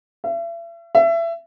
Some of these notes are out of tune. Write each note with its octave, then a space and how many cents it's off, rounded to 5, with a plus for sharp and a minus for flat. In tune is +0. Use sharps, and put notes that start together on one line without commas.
E5 +40
E5 +25